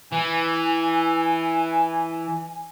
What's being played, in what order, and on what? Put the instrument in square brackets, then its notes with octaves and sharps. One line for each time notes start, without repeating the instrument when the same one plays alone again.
[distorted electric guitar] E3 [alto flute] G#5